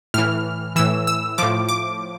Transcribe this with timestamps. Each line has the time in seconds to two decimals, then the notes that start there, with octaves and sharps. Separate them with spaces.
0.14 A2 E3 F6
0.76 A2 E3 E6
1.07 E6
1.38 A2 F3 D6
1.69 D6